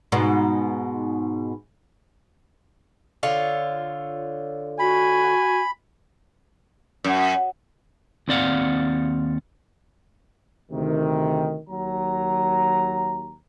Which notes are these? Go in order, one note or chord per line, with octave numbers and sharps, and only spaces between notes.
G#2 B2
D3 F4 C#5
F#4 G#5 B5
F#2
D#2 C4 D5 F5 F#5
D2 C3 D#3
D#2 F#3 A#5